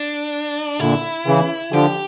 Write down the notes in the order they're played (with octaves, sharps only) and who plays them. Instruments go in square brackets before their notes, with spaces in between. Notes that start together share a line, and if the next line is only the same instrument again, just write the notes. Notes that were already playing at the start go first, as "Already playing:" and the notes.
Already playing: [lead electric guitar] D4
[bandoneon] A#2 D3 [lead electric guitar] E4
[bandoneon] C#3 E3
[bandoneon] D3 F3 [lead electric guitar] G4